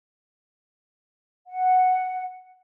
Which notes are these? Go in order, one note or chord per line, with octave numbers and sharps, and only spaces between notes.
F#5